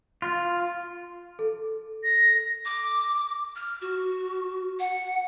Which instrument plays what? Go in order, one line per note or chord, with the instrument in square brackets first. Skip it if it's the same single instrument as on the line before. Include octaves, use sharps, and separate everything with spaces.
[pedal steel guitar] F4
[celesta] A4
[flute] A#6
[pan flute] D6
F6
F#4
F#5